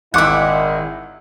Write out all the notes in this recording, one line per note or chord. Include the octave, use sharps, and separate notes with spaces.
G#1 A#2 G#3 E4 E5 F#5 D6